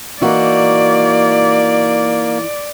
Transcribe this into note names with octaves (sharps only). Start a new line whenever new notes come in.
E3 A#3 D#4 F#4 D5